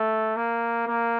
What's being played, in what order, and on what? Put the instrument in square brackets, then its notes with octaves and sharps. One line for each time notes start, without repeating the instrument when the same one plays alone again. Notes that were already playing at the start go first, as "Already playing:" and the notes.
Already playing: [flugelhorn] A3
A#3
A#3